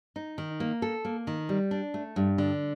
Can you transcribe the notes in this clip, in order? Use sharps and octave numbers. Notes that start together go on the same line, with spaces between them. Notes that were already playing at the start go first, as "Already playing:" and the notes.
D#4
D#3
A#3
A4
A#3
D#3
G3
D4
A3
G2
D3